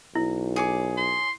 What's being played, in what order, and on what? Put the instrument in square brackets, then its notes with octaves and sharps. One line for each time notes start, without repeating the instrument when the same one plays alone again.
[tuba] B1 [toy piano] E4
[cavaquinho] G#4 C#5 D6
[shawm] C6